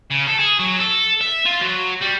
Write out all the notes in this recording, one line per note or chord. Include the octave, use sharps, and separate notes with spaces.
C#3
A4
G#4
F#3
A4
E5
F4
F#3
G3